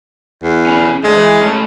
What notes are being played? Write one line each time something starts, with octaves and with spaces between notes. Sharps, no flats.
E2
C#4 B5
D2 G#3
E3
A3 C#4